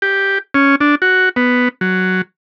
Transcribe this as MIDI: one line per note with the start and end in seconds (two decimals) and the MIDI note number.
0.02 0.38 67
0.54 0.75 61
0.81 0.95 62
1.02 1.29 66
1.36 1.69 59
1.81 2.22 54